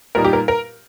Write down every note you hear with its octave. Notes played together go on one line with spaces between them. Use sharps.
A#2 G3 D#4 A#4
G4
A#4
A#4